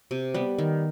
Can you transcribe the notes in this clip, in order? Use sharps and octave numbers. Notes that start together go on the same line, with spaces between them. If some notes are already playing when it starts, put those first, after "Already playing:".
C3
G3 B3
D#3